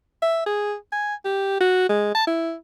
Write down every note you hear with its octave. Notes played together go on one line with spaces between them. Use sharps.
E5
G#4
G#5
G4
F#4
G#3
A5
E4